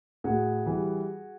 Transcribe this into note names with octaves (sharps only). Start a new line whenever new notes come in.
A2 F#4 G#4
E3 G3